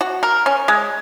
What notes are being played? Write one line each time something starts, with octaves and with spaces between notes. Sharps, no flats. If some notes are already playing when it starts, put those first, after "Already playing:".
F#4
A#4
C#4
G#3